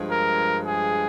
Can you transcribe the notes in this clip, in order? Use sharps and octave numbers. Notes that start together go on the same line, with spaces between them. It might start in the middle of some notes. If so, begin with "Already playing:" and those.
Already playing: G2 F3 G#3
A#4
G#4